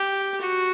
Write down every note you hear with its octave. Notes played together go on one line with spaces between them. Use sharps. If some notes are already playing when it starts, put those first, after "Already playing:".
Already playing: G4
F#4